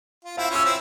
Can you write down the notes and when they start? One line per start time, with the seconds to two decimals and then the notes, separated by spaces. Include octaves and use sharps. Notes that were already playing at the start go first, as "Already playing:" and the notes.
0.25 F4
0.37 C4 E4 F5
0.51 C#4 F4 E6
0.65 C4 E4